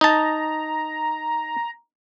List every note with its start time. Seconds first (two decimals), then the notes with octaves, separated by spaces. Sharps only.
0.01 D#4 A5 A#5